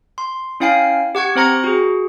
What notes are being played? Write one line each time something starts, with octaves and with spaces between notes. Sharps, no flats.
C6
C#4 E4 F5 G5 G#5 C7
G4 F#5 C#6 G#6
C4 C5 A#5 A#6 C#7
F#4 G#4